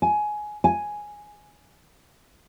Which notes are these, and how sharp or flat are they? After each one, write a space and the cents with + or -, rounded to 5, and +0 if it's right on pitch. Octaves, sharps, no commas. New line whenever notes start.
G#5 +15
G#5 +0